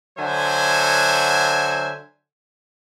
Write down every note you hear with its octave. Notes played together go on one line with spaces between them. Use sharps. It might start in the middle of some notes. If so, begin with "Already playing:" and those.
D3 F#3 C5 E5 G#5